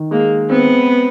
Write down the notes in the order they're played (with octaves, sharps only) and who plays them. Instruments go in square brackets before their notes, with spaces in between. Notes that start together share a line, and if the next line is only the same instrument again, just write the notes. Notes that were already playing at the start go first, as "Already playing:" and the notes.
Already playing: [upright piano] D#3
[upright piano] G#3 [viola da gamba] A#3
[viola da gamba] B3 [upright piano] C4